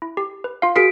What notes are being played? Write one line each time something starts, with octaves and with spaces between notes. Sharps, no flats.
E4
G4
B4
F4 F5
F#4 G#4 A#4 B6 C7 D7